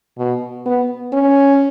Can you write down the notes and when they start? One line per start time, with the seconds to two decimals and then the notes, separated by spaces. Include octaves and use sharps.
0.18 B2
0.66 B3
1.13 C#4